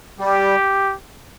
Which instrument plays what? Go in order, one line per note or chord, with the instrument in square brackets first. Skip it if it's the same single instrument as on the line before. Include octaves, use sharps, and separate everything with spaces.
[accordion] G3 [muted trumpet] G4